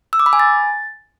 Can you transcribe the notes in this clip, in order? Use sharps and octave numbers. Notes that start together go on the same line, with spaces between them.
E6
D6
B5
G#5
A6